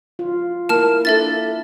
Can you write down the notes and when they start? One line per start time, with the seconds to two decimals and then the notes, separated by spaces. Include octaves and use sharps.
0.19 F4
0.69 A#3 E4 A#4 A5 F6
1.05 D4 A4 E5 A6